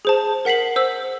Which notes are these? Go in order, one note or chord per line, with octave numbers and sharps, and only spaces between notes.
G#4 C5 A5
A#4 F#5 B6 C7 F#7
C5 E6